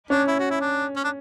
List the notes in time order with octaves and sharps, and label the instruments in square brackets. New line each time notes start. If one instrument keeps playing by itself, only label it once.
[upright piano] C#4 [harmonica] D4
[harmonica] E4
F#4
E4
D4
C#4
D4